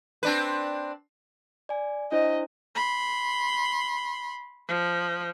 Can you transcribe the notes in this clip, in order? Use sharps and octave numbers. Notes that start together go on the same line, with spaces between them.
C4 D4 B4
D5 G#5
D4 E4 C5 D#5
B5 C6
F3